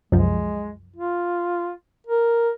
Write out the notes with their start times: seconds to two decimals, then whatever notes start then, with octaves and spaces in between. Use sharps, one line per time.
0.12 C2 F#2 F3 G#3
0.96 F4
2.07 A#4